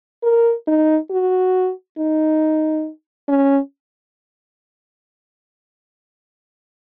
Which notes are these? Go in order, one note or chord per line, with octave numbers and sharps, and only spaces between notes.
A#4
D#4
F#4
D#4
C#4